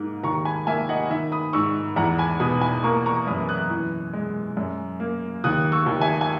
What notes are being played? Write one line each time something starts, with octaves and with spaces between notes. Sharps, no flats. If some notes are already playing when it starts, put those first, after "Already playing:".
Already playing: G#2 A#3
D#2 A#5 C#6
G#5 B5
A#3 E5 G#5
D#5 F#5
D#3 E5
B5 D#6
G#2 C#6 E6
E2 F#5 A#5
G#5 B5
B2 B5 D#6
G#5 B5
A#3 A#5 C#6
A#5 C#6
F#2 B5 D#6
D#6 F#6
E3
G#3
F#2
A#3
D#2 D#6 F#6
C#6 E6
D#2
E5 G#5
G#5